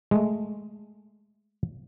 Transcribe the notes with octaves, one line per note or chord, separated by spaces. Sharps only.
G#3 A3